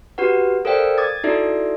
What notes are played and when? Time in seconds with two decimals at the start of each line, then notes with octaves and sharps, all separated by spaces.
0.18 F#4 G4 B4 F#5
0.65 A4 A#4 C5 D5 F5 G5
0.98 D6 D#6 G#6 A6
1.24 D#4 E4 F#4 A4 D5 E5